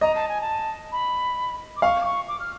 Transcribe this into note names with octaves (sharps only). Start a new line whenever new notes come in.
D#5 A#5
A5
G#5
A5
B5
D6
F5 C#6
D6
C#6
D6
F6